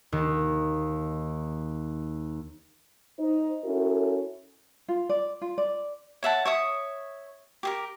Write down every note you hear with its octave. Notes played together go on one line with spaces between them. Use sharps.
D#2 D#3
D#4 C5
C#4 E4 F#4 A4 A#4
F4
D5
F4
D5
C#5 E5 F#5 A5
C#5 E5 D#6
G4 G#4 A#4